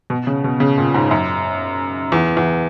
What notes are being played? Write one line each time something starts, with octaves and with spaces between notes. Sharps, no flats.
B2
C#3
B2
C#3
A#2
G#2
F#2
E2
E2